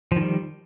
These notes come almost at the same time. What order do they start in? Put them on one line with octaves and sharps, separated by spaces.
F3 D#3 G3